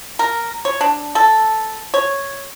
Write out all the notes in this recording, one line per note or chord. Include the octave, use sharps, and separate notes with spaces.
A#4
C#5
D4
A4
C#5